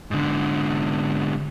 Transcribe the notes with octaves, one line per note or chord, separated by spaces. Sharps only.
G#2 D3